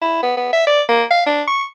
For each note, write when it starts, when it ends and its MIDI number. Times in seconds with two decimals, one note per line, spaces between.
0.01 0.20 64
0.23 0.35 59
0.37 0.50 59
0.53 0.66 76
0.67 0.82 74
0.88 1.03 58
1.11 1.22 77
1.26 1.42 62
1.47 1.63 85